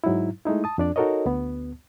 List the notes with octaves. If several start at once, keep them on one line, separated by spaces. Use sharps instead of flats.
G#2 F#3 D#4 E4
G#3 A3 D#4 E4
A5 D#6
F2 D4 D5
D#4 F#4 A4 A#4 C#5 D#5
D2 B3